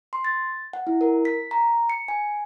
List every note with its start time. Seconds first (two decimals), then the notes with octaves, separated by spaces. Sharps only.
0.13 C6
0.24 A6
0.73 F#5
0.87 E4
1.01 A#4
1.25 B6
1.51 A#5
1.90 C#7
2.08 G#5